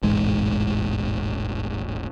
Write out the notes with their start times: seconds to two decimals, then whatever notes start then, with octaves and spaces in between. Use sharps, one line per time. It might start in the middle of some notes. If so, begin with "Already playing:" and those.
0.03 E1 A1 G#2 G#3